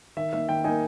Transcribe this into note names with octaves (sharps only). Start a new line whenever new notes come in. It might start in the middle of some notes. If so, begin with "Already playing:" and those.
D#3 E5
A#3 D#4 E5
D#3 G5
A#3 D#4 G#5